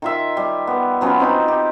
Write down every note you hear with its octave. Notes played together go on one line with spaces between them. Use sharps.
D#3 F4 E5
G3
B3
F#3 B3 C#4 F4
C4 D#4 B5
G4